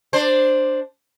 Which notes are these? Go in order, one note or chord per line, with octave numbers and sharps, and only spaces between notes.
D4 C5